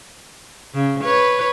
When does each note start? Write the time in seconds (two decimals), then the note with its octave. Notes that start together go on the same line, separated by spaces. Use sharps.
0.74 C#3
1.04 B4 C#5